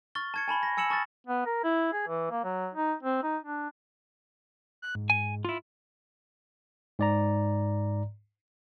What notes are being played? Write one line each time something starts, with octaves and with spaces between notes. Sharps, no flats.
C#6 F6 A6 G7
A5 G#6 C#7
G#5 A5 B5 G7
A#6
G#5 E6 C#7 E7 F#7
A5 C#6 D#6 F6 A6
B3
A#4
E4
G#4
E3
A#3
F#3
D#4
C4
D#4
D4
F#6
G#2
G#5
E4 F4
G#2 D5 A#5